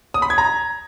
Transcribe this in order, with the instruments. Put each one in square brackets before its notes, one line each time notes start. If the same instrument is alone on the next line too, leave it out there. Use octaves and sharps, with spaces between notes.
[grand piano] D#6
B5
G#6
A#5